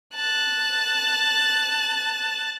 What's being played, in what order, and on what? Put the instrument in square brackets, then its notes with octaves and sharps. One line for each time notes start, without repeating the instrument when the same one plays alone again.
[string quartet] A5 F#6